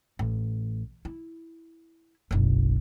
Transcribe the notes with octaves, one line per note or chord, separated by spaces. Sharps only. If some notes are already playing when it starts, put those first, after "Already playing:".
A1
E4
F#1 B1